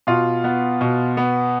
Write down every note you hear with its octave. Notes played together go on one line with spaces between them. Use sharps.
B2 F4
B3
B2
B3